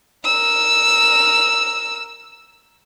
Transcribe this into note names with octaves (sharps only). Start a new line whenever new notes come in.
A#4 E6